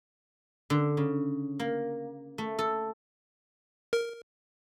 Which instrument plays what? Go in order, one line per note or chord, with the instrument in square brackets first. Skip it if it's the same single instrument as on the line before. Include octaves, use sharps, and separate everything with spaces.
[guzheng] D3
C#3
A#3
A3
A4
[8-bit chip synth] A#4